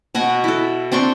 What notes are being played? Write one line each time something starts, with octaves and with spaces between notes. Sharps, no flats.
B2 F#4 D#5 G#5
E4 A4
C4 D4 C6 C#6